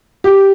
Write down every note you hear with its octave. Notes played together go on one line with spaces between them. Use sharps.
G4